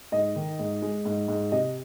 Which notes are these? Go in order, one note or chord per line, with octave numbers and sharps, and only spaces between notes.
G#2 D#5
D#3
G#2
G#3
G#2
G#2
C3 D#5